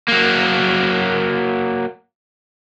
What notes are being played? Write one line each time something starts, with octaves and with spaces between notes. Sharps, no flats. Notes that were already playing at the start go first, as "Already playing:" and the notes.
F#3 A#3